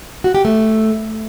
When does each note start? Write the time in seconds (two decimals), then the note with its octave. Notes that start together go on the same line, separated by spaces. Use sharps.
0.24 F#4
0.35 G4
0.45 A3